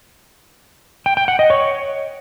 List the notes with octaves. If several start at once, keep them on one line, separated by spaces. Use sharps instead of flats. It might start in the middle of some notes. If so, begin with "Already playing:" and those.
G5
G5
F#5
D#5
C#5